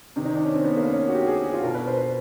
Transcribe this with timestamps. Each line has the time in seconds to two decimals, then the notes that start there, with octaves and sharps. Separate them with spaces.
0.16 C3 D#3
0.25 D#4
0.35 D4
0.44 C#4
0.54 C4
0.65 B3
0.77 A#3
0.89 C#4
1.09 F#4
1.15 G4
1.27 G#4
1.36 G4
1.44 F#4
1.53 F4
1.63 B2 A#4
1.74 B4
1.88 C5
1.97 B4